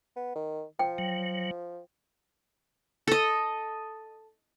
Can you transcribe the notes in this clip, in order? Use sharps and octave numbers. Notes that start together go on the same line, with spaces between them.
B3
D#3
F3 G5
F#3
A4 D#5